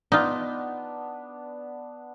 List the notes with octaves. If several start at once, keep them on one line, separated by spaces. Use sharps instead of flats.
B3 D4 D#4 F4